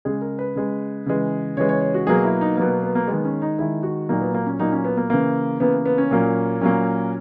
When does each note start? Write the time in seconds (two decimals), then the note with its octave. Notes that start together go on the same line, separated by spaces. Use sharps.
0.05 C#3 G#3 G#4
0.21 A#4
0.39 B4
0.56 C#3 G#3
1.06 C#3 E3 G#3
1.57 C#3 E3 G#3 C#5
1.69 C#5
1.81 C#5
1.94 F#4
2.07 B2 F#3 A#3 G#4
2.24 E4
2.41 D#4
2.57 B2 F#3 A#3 B3
2.70 B3
2.83 B3
2.95 A#3
3.08 D#3 G#3 B3
3.25 C#4
3.42 D#4
3.59 D#3 G#3 E4
3.83 F#4
4.09 A#2 F#3 A#3 D#4
4.21 B3
4.34 A#3
4.46 C#4
4.59 A#2 F#3 A#3 D#4
4.72 C#4
4.84 B3
4.97 A#3
5.10 C#3 E3 A#3
5.60 C#3 E3 A#3 B3
5.85 B3
5.98 C#4
6.11 A#2 F#3 A#3
6.61 A#2 F#3 A#3 C#4